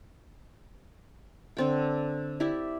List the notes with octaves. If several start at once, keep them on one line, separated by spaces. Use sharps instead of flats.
D3 C4 G5
E4 G4 D5 E5